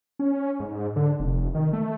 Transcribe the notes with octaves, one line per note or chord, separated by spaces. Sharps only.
C#4
G#2
D3
F1
D#3
A3